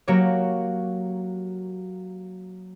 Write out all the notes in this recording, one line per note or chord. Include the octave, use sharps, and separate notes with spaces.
F#3 A#3 F#4 G4 C#5